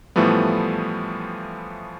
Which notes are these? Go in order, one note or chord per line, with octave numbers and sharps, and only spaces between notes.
A2 E3 F3 G3 A3 B3